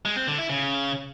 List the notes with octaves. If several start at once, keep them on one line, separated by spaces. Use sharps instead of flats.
G#3
C4
D3
E4
C#3